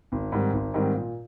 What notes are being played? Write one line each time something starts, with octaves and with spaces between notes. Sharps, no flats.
G#1
G#2 D#3 G3 C4
G#1
G#2 D#3 G3 C4
A#2